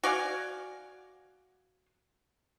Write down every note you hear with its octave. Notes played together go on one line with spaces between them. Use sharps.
F#4 D5 F5 G#5